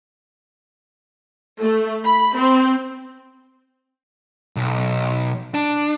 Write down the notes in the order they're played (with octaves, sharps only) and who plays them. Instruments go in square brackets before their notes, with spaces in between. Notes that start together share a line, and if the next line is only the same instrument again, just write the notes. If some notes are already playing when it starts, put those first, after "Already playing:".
[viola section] A3
B5
C4
[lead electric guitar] B1
D4